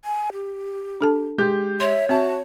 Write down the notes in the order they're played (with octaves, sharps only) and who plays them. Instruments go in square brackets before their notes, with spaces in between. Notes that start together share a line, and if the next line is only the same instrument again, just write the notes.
[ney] G#5
G4
[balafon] D4 A4 A5
[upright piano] G#3 G4 G6
[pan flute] C#5 [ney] E5 [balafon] C6
[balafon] C4 [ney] F#4 [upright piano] E5 A5